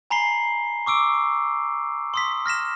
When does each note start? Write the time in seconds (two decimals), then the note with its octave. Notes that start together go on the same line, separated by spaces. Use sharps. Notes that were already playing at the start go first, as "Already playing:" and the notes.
0.11 G#5 A#5 B5 C7 G7
0.86 C#6 D6 E6 D7
2.14 C6 D#6 B6
2.46 F6 A#6 B6 E7